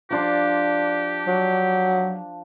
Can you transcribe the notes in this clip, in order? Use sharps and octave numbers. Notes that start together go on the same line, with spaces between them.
F3 D4 G4 C6
F#3